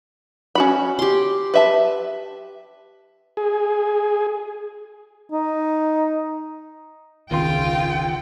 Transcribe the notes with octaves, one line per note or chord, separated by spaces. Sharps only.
C#4 F#4 B5
G4 C6
B4 E5 A5
G#4
D#4
E1 C#2 D#3 F4 G5 C6